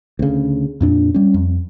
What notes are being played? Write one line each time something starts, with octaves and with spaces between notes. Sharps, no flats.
D2 C#3
F2 A#2 D4
G3 C#4
F2